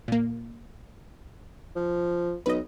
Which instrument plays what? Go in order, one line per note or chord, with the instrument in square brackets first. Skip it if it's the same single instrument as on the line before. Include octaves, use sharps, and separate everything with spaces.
[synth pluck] A#2 A#3
[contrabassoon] F3
[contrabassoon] B1 [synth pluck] B4 D#5